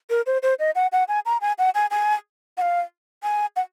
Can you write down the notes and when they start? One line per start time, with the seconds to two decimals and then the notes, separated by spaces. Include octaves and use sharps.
0.10 A#4
0.26 C5
0.43 C5
0.59 D#5
0.75 F#5
0.92 F#5
1.08 G#5
1.26 A#5
1.41 G#5
1.59 F#5
1.75 G#5
1.91 G#5
2.58 F#5
2.62 F5
3.23 G#5
3.56 F#5